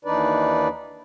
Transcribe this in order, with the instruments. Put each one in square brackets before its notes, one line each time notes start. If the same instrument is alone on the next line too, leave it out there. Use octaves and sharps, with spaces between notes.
[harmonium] D#2 E3 D4 D#4 B4 D5